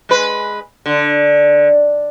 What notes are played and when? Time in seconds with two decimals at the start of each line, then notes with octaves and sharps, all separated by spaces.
0.09 G#3 B4
0.86 D3